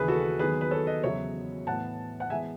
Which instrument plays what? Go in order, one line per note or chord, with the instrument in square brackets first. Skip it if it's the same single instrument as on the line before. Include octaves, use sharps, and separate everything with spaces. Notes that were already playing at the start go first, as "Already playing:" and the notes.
Already playing: [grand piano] D#2 C#3 E3 G#4 B4
F#4 A4
D#2 D#3 F#3 B3 G#4 B4
B4
A4 C#5
B4 D#5
E2 C#3 F#3 B3 C#5 E5
A2 E3 B3 F#5 A5
F#5
E3 G#3 B3 E5 G#5